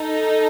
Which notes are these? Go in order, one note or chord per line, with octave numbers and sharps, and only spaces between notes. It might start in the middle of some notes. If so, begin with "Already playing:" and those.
Already playing: D#4 A4